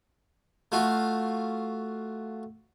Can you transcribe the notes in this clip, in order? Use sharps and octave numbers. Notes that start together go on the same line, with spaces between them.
A3 F4 F#4